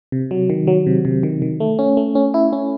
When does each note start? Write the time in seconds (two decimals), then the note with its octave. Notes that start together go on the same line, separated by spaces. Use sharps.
0.12 C3
0.31 F#3
0.50 D#3
0.67 F#3
0.87 C3
1.05 C3
1.23 D#3
1.42 D#3
1.60 A3
1.79 C#4
1.97 A3
2.15 C#4
2.34 E4
2.53 C#4